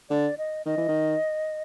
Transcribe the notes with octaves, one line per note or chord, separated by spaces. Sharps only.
D3 D5
D#5
D#3 D#5
E3
D#3